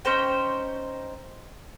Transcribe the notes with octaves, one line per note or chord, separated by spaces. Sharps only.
C#4 D#4 C5 G5